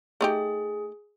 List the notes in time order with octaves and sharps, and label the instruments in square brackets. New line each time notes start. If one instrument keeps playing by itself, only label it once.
[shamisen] A3 D#4 G4 [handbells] G#4